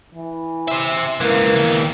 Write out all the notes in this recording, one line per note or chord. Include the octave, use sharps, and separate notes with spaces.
E3
C5 E5
C#2 E3 A#3
D#2 E3